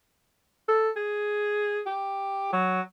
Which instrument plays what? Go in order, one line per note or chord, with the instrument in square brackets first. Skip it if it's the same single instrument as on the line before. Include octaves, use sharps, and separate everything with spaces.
[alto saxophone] A4
G#4
G4
F#3